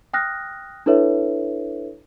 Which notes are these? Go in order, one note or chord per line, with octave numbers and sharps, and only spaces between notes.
G5 D#6 F6 F#6 A#6
D4 E4 A4 B4 C#5 E5